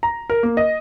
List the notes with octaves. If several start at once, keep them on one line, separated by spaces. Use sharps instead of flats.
A#5
A#4
A#3
D#5